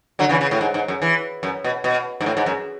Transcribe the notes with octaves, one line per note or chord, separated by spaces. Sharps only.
D3 F#3
C#3 E3
C#3
A2
G#2
G#2
F#2
E3
F#2
B2
B2
G#2
A2
G#2
F#2